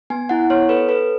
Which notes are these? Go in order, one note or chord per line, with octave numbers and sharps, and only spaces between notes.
B3 G#5
E4 F#5
B3 C#5
A4 B4
A4 B4